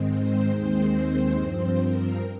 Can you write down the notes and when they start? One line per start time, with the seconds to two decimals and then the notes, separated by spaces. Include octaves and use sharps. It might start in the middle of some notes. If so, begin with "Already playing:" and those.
Already playing: G#2 D#3 G#3 C4
0.08 C5
0.51 D#2 D#3 G#3 C4 C5
0.93 C5
1.34 G2 F3 C4
1.78 A#4